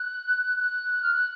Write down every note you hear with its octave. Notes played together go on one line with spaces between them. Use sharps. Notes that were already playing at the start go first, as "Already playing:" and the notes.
Already playing: F#6
F#6
F6
F#6